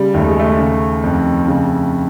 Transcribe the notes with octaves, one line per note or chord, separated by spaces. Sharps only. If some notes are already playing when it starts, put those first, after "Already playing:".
Already playing: C#3 G3
D#2 A3
G#3
A3
C#3
F2
C#3